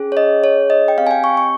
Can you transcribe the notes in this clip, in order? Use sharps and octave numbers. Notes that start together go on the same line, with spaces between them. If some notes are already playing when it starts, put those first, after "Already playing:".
Already playing: C#4 G#4
C#5
D#5
C#5
D#5
G5
C4 G4 F5
G#5
G5
C#6
C#6